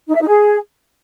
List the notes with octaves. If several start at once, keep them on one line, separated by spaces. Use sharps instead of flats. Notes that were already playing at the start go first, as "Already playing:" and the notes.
D#4
E5
D#4
G#4